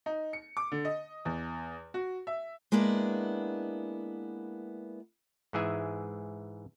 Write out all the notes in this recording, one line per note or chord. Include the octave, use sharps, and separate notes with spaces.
D#4
C#7
D6
D3
D#5
E2
F#4
E5
G#3 A#3 B3 D4 E4
G#2 E3 G#4 E5 G#5